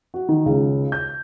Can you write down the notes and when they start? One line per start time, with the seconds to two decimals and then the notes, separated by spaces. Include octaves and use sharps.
0.14 F#4
0.29 D#3
0.46 C#2
0.92 G6